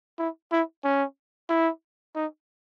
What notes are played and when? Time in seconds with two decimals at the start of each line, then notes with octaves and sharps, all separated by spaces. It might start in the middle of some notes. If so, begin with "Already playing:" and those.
0.19 E4
0.52 E4
0.84 C#4
1.49 E4
2.16 D#4